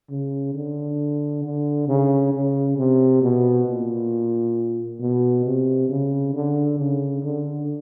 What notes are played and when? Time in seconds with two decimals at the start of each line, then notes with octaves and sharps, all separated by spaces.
0.10 C#3
0.55 D3
1.44 D3
1.88 C#3
2.33 C#3
2.78 C3
3.22 B2
3.67 A#2
5.00 B2
5.45 C3
5.89 C#3
6.34 D3
6.78 C#3
7.23 D3